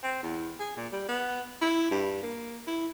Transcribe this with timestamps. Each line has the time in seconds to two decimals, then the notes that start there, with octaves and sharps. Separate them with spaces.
0.03 C4
0.23 E2
0.60 G#4
0.77 A#2
0.92 G3
1.09 B3
1.61 E4
1.91 G2
2.23 A#3
2.67 E4